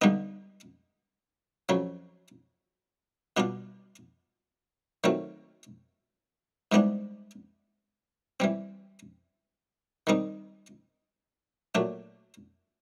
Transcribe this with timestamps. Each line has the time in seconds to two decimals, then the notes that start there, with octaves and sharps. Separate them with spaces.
0.02 G2 D3 G3 B3 D#4
1.69 F2 C#3 F#3
3.37 B2 G3 B3 D4 F4
5.04 D#3 F#3 A3 C4 F4
6.72 G#2 E3 G3 B3 D4
8.40 E3 G3 C4
10.07 D#3 G3 C4 D#4
11.75 A#2 F#3 A3 D4